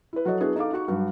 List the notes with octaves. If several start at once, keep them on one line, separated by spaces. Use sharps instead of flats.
E4 B4
F#3 F#4 A4 C#5 D#5
B3 D4 E4 F#4 G#4
D#4 A4 F5 D6
D#4 F#4 C#6
G2 F#3